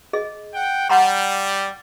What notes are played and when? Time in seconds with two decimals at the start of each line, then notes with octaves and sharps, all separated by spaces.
0.13 G#4 D#5
0.54 F#5 G5
0.89 G3 F#5 A#5 C6